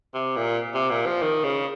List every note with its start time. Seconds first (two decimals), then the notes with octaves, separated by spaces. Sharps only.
0.14 C3
0.36 A#2
0.74 C3
0.90 A#2
1.06 F3
1.22 D#3
1.44 C#3